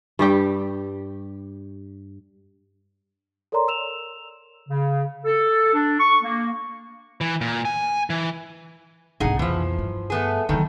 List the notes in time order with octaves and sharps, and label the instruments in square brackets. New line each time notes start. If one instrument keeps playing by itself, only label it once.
[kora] G2 G3 G4 G5
[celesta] A4 A#4 C#5 D5 A#5 C6
E6 E7 F7
[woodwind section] C#3
A4
D4
C#6
A#3
[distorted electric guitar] E3
A#2
G#5
E3
[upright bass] C2 G#2 [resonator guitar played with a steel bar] D#4 G#4 F#5
[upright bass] F2 B2 [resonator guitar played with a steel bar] E3 F3
[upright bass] G2
[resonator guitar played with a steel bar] A3 B3 G#4
[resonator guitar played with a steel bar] E2 D#3 A4 [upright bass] D3 F#3